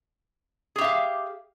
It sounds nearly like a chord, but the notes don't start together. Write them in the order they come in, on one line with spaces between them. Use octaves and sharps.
G#4 G4 E5 F5